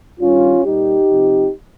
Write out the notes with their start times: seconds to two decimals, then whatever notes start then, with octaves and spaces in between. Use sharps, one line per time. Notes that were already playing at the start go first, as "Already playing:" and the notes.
0.19 G2 D#3 G3 C#4 F4
0.64 A#2 G3 A#3 D#4 G4
1.09 C3 F3 C4